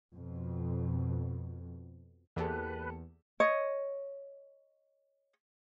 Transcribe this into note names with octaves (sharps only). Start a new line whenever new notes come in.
F2 B2
E2 A#3 G4 A4 B4
C#5 D#5